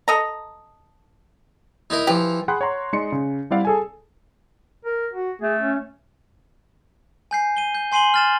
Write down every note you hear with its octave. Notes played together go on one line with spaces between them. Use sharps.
A4 D#5 A#5
D#4 E4 A#4
E3 F3 G4
G#4 F#5 G5 B5 C6 F#6
C#5 F#5 A#5 C6
G#3 D#4 D5 C6 C#7
C#3
G3 C4 E4 D5 F5 F#5
G#4 A4 G#5
A#4
F#4
A3 G#4
C#4
G#5 G6 C7
D#7 G7
G6
G#5 C6 C7 D#7 F#7 G7
F6 A6 E7